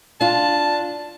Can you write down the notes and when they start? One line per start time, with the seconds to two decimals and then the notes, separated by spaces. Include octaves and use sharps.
0.21 D4 F4 A5